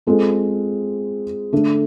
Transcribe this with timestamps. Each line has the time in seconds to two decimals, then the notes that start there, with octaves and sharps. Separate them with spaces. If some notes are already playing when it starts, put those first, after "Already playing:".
0.07 G#3 C4 F4 A4
1.53 D3 A3 D4